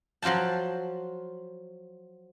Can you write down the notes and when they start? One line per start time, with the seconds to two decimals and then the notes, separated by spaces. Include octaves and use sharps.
0.22 F3 F#3 F4 G5 A5